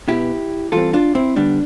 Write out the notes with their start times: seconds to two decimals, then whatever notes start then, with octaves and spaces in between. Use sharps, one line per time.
0.08 B2 B3 E4 G4
0.72 E3 G3 C4 F4 A4
0.93 D4 F4
1.15 C4 E4
1.36 D3 G3 B3 D4